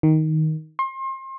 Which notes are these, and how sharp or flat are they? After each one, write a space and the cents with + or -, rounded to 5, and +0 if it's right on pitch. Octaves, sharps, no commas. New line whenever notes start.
D#3 +10
C6 +35